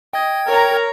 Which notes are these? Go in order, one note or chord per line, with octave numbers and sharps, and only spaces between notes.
D#5 G5 G#6
A#4 C#5 A#5